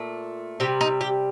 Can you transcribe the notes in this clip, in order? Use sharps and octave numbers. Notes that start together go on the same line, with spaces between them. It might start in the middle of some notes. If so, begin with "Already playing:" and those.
Already playing: A#2 A3
C3 G3 G4
D#4
G4